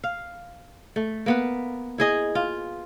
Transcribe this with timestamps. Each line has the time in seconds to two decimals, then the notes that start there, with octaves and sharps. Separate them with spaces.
0.04 F5
0.96 A3
1.26 A#3 B3 B4
1.98 E4 G#4 D#5
2.35 F4